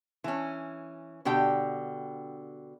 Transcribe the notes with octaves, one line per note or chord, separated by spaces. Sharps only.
E3 C#4
B2 D3 G4 G5